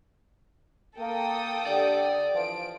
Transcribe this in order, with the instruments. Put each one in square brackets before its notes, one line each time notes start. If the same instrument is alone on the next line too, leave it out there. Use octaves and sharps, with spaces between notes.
[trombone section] A#3 [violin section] A4 G5 D#6
[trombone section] D3 G4 [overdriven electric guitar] D5
[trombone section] E3 F3 [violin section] D7